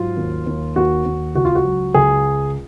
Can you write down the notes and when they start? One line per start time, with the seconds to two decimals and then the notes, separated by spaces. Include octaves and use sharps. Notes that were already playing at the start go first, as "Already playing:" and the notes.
Already playing: G#2 F#3 F4
0.17 D#2
0.46 D#2
0.76 D#2 F#4
1.05 D#2
1.35 C#2 F#4
1.45 F4
1.55 F#4
1.64 F#3
1.94 C#2 G#4